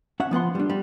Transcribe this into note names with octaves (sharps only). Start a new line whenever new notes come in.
C#4 E5 F#5
F3 B3 F#5 C6
G3 D4
G3